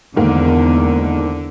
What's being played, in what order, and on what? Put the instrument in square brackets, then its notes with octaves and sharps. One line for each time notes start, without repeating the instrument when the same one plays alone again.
[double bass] E2 [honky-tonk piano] G#2 D#3 A#3 [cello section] D3